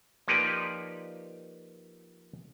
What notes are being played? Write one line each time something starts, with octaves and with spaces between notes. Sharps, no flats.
F3 A#3 D#4 G4 B4 D5